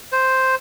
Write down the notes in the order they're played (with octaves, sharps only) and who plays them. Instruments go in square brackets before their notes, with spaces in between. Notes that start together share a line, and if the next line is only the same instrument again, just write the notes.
[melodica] C5